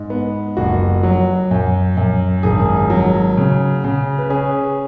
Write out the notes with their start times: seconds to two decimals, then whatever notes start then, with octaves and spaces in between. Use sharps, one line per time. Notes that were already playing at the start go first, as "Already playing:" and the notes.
Already playing: G#2
0.10 B3
0.57 F#1 F#4
1.03 F#3
1.51 F#2
1.97 F#2
2.43 G#1 G#4
2.90 F#3
3.37 C#3
3.84 C#3
4.18 B4
4.30 C#4 G#4